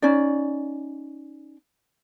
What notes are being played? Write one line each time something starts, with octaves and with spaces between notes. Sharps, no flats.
C#4 D#4 D5